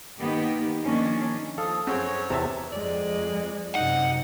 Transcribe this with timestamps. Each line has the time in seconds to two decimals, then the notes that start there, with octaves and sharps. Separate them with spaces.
0.20 D#3 A#3 B3 D#4 G4
0.83 D#3 F3 A#3 C#4 D4
1.58 F3 A4 F5 D#6
1.87 F#2 C4 G#4 C#5
2.30 E2 C3 E5 A5 A#5
2.72 F2 G#3 D5
3.75 F#2 C3 D#4 F#5